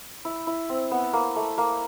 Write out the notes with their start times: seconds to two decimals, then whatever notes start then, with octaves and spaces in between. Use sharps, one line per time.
0.25 E4
0.47 E4
0.69 C4
0.91 B3
1.13 A#3
1.36 A3
1.58 A#3